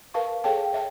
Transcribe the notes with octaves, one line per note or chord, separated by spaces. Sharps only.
A#4 B4 F5 A5 C#6
G#4 A4 C#5 F5 G5 A5
C#5 E5 G5 A5